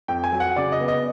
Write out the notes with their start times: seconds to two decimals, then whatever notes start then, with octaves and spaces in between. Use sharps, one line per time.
0.08 F2 G5
0.24 G#5
0.32 F#3
0.40 F#5
0.56 C#3 D5
0.72 D#5
0.80 B3
0.88 D#5